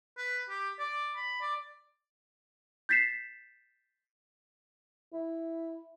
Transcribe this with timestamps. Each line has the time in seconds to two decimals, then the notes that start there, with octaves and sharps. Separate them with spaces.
0.18 B4
0.49 G4
0.79 D5
1.16 B5
1.41 D5
2.89 G6 A6 B6 C7 E7
5.13 E4